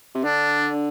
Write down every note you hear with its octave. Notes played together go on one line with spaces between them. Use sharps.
C3
D3 D4